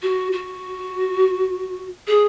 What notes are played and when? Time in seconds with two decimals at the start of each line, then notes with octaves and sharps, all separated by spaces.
0.02 F#4
0.32 F#4
2.07 G#4